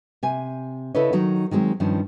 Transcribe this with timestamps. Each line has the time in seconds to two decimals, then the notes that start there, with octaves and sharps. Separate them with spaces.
0.23 C3 G#5
0.95 C#3 E4 A4 B4 C#5 D#5
1.13 D#3 F#3 D#4
1.51 D#3 F#3 G#3 C4
1.80 G2 D#3 F3 C#4